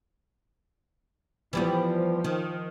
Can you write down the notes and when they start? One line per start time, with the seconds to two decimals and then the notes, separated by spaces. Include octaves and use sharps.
1.53 E3 F3 G3 B3
2.24 D#3